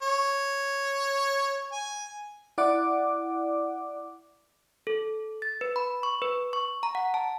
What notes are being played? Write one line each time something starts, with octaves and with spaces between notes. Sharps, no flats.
C#5
G#5
E4 D5 F#5 D6
A4
A6
B4
B5
C#6
B4
C#6
A#5
F#5
A5